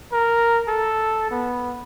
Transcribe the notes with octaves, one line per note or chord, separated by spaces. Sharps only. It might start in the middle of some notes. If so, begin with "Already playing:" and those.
A#4
A4
B3